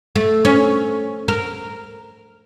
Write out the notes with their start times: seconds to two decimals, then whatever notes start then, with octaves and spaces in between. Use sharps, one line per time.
0.16 A3
0.45 C#4
1.28 A#4